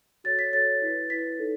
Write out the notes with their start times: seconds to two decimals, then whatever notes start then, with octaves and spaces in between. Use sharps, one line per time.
0.24 F#4 A4 C#5 A6
0.39 B6
0.53 F#4 A4 C#5 A6
0.82 E4 B4
1.10 E4 B4 B6
1.39 D#4 A4 C#5